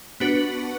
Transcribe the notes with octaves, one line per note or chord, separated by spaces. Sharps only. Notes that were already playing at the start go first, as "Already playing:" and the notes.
B3 D4 F#4 B4